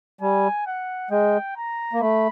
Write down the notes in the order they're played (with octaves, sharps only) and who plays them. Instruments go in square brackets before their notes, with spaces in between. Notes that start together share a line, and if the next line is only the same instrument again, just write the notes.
[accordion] G3 [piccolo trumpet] G#5
[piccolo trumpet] F#5
[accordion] G#3 [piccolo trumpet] G5
[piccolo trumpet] A#5
[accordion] A#3
[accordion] A3 [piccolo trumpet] B5